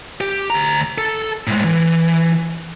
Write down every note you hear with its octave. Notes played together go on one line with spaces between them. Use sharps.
G4
D2 A#5
A4
A2 G#3
E3